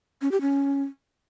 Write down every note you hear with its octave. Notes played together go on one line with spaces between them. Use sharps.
C#4
G4
C#4